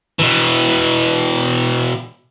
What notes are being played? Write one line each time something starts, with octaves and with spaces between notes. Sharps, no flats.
B2 E3